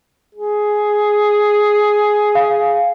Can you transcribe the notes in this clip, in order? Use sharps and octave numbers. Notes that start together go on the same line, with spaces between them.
G#4
F5